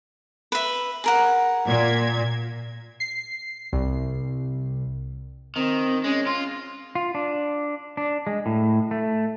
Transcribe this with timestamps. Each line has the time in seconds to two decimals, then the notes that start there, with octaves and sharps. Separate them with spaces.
0.52 B4 E5
1.04 G#4 A#4 F#5
1.65 A#2 G#6
3.00 C7
3.73 C2
5.56 D#3 C4
6.04 G#3 C#4
6.27 F4 C6
6.95 F4
7.15 D4
7.97 D4
8.27 G#3
8.46 A2
8.91 A3